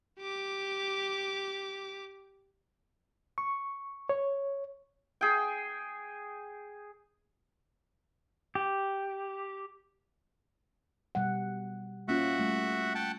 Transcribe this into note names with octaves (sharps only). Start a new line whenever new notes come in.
G4 D6
C#6
C#5
G#4 G5
G4
B2 G3 F#5
A#3 C#4 F4 F#4 E5 F#5
G3 A3
F#5 G5 A5